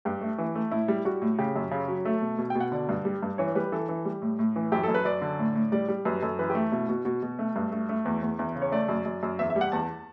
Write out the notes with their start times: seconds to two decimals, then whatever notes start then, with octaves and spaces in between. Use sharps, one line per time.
0.05 G2 G4
0.21 A3
0.38 E3
0.55 A3
0.71 A2 E4
0.88 G3
1.05 G3 F#4
1.22 A2
1.39 C#3 G4
1.56 F#2
1.71 C#3
1.88 F#3
2.05 A3 A4
2.22 B2
2.38 B2
2.50 G5
2.55 B2
2.60 F#5
2.72 D3 D5
2.89 G2
3.05 G3
3.23 G2
3.38 E3 C#5
3.55 G3 B4
3.72 E3 A4
3.89 E3
4.05 G3
4.22 A2
4.39 A2
4.56 E3
4.72 F#2 G4
4.83 F#2 A4
4.94 B4
5.05 F#2 D5
5.21 D3
5.39 A2
5.55 A2
5.72 G3 D5
5.88 G3
6.05 F#2 B4
6.22 F#2 A4
6.39 E3 B4
6.50 G4
6.55 A3
6.72 B2 E4
6.89 B2 F#4
7.05 B2 F#4
7.23 B2
7.39 A3
7.56 G2
7.72 A3
7.89 A3
8.05 E2
8.23 E2
8.39 E2 E4
8.56 C#3
8.62 C#5
8.72 A3 D5
8.89 F#2
9.06 F#2
9.23 F#2
9.39 E2 E5
9.50 E5
9.56 G3
9.61 F#5
9.72 E2 A5